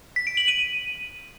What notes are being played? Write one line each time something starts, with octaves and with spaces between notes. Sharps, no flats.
B6
D7
F#7
D#7